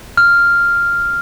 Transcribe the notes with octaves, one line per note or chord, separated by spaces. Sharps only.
F6